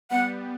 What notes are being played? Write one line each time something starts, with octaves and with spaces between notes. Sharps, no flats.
G3 B3 F#5